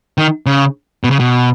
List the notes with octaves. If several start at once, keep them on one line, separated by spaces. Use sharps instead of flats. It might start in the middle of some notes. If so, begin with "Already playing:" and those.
D#3
C#3
B2
C#3
B2